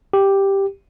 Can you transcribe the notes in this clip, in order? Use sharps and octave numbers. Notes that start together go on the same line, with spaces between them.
G4